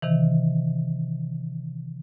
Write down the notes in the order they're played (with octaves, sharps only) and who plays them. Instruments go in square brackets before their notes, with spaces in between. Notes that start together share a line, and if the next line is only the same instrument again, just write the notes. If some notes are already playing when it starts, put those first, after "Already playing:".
[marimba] C3 D#3 E3